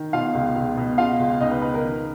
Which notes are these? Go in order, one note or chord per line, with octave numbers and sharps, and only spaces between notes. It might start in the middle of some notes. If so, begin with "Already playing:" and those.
Already playing: D#3
B2 F4 F5
C#2
C#2
B2
C#3 F4 F5
C#2
C#2 D#4 D#5
B4
C#3 B4
A#4
D#3